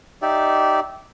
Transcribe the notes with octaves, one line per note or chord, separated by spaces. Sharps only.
D#4 G4 D5 E5